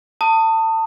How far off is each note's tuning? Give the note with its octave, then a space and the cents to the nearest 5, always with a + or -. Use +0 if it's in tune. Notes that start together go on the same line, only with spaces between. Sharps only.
A5 +30 D#6 +0